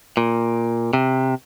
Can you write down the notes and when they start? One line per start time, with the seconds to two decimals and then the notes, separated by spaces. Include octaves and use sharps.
0.17 A#2
0.93 C3